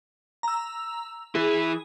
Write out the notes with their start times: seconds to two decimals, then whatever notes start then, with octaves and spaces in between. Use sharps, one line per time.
0.43 A#5 E6
1.35 E3 E4 G#4